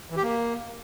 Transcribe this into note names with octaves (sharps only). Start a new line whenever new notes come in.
E3
G4
A#3